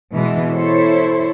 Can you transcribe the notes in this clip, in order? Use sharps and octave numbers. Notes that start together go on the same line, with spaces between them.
B2 E3 G#3
E4 A4 C5 C#5